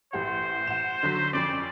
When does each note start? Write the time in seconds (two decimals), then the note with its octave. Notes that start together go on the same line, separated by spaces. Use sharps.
0.13 A1 G4 C5 F#5
0.67 F#5 E7
1.03 D3 F#3 B6
1.33 F2 C#4 D5